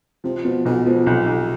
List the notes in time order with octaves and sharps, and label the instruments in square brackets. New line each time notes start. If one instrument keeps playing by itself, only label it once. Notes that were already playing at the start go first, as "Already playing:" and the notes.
[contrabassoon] C3 [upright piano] F3
[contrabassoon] B2 [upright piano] F3
[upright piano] B1 [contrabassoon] B2
[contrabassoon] B2 [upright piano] F3
[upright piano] B1 [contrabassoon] C3
[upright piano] B1